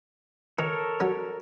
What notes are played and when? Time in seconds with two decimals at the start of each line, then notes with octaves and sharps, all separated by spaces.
0.59 D#3 A4 A#4 C#5
1.00 F#3 C#4